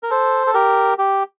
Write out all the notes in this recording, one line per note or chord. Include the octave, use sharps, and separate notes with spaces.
A#4
A4 C5
A4
G4 A#4
G4